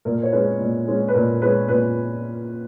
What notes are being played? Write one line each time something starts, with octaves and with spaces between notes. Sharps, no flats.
A#2 A#4
C#5
G#3 C#4 B4
A#2
G#3 C#4
B4
A#2 A#4
G#3 C#4 B4
A#2 B4